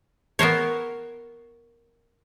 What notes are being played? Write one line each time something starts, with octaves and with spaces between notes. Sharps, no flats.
B3 A#4 C5 C#5